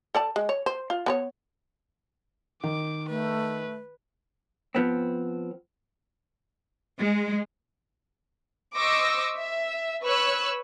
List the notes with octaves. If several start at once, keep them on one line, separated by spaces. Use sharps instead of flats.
A4 D5 A5
G#3
C#5
C5
F4
B3 B4 C#5
D#3 D6
A3 B4
F3 B3 C4
G#3
C5 D#5 C#6 D6 E6 A#6
E5
B4 C#5 C#6 E6 F#6